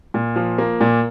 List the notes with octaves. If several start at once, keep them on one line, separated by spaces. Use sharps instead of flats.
A#2
F3
A#3
A#2